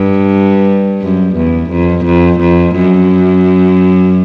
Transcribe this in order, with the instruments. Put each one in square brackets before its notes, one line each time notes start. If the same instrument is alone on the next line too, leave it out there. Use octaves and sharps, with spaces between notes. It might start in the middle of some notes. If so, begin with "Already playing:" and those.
Already playing: [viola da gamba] G2
F#2
E2
F2
F2
F2
F#2